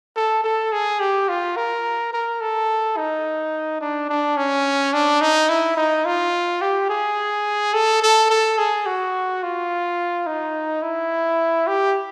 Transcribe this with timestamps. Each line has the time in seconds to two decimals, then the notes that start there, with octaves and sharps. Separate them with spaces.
0.16 A4
0.44 A4
0.72 G#4
1.00 G4
1.29 F4
1.57 A#4
2.13 A#4
2.41 A4
2.97 D#4
3.81 D4
4.09 D4
4.37 C#4
4.93 D4
5.21 D#4
5.49 E4
5.77 D#4
6.05 F4
6.61 G4
6.90 G#4
7.74 A4
8.02 A4
8.30 A4
8.58 G#4
8.86 F#4
9.43 F4
10.27 D#4
10.83 E4
11.67 G4